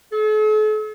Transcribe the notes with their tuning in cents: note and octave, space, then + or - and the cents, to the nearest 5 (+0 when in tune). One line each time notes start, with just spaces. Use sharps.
A4 -45